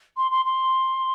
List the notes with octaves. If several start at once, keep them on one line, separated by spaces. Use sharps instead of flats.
C6
C6
C6